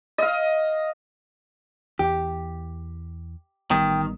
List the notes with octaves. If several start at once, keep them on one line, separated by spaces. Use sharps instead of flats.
D#5 F5
E2 E3 G4
A1 D#3 G3 B3 G5